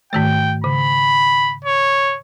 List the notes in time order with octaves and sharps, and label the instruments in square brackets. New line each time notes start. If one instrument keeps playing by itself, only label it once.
[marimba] G#2 D#3 A3 [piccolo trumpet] G5
[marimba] C#3 [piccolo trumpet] B5
[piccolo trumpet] C#5